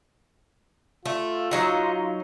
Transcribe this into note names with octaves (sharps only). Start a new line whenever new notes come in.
A3 F4
F#3 D#4 F#5